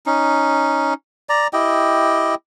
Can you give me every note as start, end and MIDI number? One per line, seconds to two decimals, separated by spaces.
0.06 0.94 61
0.06 0.94 63
1.29 1.47 74
1.29 1.47 82
1.53 2.35 64
1.53 2.35 67
1.53 2.35 75
1.53 2.35 79